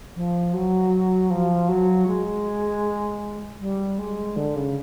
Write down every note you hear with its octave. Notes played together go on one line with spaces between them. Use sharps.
F3
F#3
F3
F#3
G#3
G3
G#3
D3
C#3